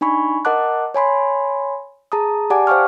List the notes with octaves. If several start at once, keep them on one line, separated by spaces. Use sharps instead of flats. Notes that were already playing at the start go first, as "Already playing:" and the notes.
D4 D#4 G#5 B5 C#6
A#4 D#5 F#5 A5 D6 F#6
C#5 G#5 B5 C6
G#4 A5 A#5 D#6
G4 D5 F#5 G#5 A5 D6
C5 F5 G5 C#6 F6